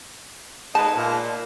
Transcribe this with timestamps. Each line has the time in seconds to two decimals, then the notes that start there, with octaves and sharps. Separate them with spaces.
0.75 G#3 D#4 B4 A5
0.96 A#2